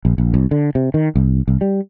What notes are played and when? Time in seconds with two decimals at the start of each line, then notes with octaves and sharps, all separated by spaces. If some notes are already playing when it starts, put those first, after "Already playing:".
0.05 A#1
0.18 A#1
0.34 C2
0.51 D3
0.75 C3
0.94 D#3
1.15 C2
1.48 C2
1.61 G3